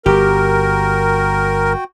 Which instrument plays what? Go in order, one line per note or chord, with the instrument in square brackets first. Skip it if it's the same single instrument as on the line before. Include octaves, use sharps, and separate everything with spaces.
[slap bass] G1 [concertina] F#4 G5 [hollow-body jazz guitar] G4 [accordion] A#4